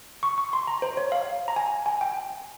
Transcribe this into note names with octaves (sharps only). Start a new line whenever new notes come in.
C#6
C#6
C6
A#5
C5
C#5
F5
A#5
G#5
G#5
G5